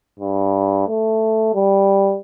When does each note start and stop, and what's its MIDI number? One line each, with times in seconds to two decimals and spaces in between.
0.19 0.87 43
0.88 1.51 57
1.55 2.17 55